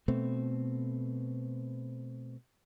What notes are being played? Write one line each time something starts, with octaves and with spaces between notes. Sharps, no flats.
B2 A3 C4